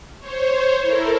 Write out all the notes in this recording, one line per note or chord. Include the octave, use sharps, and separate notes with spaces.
C5 C#5
E4 A4 A#4